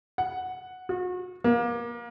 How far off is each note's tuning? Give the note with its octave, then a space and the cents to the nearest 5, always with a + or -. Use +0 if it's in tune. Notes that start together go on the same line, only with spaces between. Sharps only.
F#5 +0
F#4 -35
A#3 +25